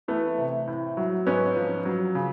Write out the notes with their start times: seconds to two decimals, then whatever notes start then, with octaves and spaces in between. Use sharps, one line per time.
0.08 E3 A3 B3
0.38 C3
0.67 A2
0.97 F#3
1.26 G#2 B3 C#4
1.56 F3
1.85 F#3
2.15 C#3